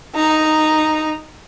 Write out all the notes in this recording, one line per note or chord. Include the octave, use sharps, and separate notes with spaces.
D#4 A#5